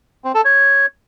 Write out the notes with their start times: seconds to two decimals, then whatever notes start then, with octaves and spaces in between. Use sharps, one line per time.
0.24 C4
0.34 A4
0.45 C#5